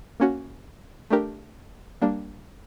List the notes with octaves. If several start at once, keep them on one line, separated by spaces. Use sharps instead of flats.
A#3 C#4 F#4
A3 D4 G4 A#4
G3 A#3 D4